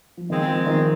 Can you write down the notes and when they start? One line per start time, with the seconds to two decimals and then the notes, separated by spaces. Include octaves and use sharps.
0.17 F3
0.29 A#2 D#3 G#3 C4
0.48 F3
0.67 D#3